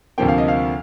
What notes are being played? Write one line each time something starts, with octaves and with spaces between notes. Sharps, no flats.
D2 C3 F3 A#3 G5
F5
D#5
F5